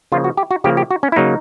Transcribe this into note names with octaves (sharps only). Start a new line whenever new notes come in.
C#3 F3 A#3 F4
F#4
G4
F#4
C#3 F3 A#3 G4
G4
F#4
C#4
E4
C#3 F#3 A#3 D#4